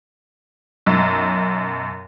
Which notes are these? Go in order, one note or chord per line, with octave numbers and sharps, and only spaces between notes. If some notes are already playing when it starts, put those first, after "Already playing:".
B1 F#2